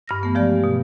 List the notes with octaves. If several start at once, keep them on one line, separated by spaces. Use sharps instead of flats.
G2 F6 A#6
E3 A3 B3
F3 G#3 G4 D5
B2